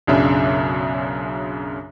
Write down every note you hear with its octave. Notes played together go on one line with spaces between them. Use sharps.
B1 F#2 C#3 D4 E5